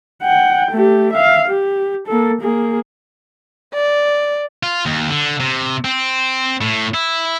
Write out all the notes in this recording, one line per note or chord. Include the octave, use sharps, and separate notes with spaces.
F#5 G5
A3 G4
E5 F5
G4
A#3 A4
A#3 G#4
D5
F4
D#2
D3
C3
C4
A2
E4